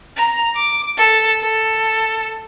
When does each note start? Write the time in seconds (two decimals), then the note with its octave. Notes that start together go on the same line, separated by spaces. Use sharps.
0.17 A#5
0.56 D6
0.97 A4
1.42 A4